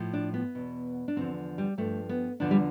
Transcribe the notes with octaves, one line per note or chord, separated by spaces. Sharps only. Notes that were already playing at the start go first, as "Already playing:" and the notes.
Already playing: A2 F3
D4
B3
E2 B2
D4
E2 D3 F3 C4
G3
G2 F3 A3
B3
E2 D3 F3 D4
G3